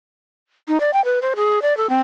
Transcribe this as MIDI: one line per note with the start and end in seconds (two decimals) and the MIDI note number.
0.68 0.80 63
0.80 0.91 74
0.93 1.03 79
1.05 1.19 71
1.22 1.34 72
1.36 1.62 68
1.62 1.76 74
1.77 1.90 69
1.90 2.00 60